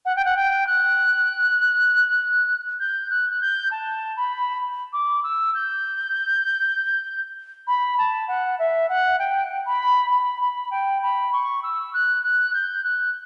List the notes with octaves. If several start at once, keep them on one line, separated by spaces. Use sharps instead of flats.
F#5
G5
F#5
G5
F#6
G6
F#6
F#6
G6
A5
B5
D6
E6
G6
B5
A5
F#5
E5
F#5
G5
B5
B5
B5
G5
B5
C#6
E6
F#6
F#6
G6
F#6